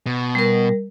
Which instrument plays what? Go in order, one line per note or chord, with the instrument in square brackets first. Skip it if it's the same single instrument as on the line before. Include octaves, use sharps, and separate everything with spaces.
[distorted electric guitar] B2
[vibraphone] G3 A#4